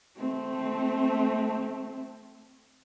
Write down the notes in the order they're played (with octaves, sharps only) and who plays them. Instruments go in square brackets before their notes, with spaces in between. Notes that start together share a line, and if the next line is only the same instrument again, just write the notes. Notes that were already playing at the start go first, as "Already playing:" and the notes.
[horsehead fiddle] A3 C4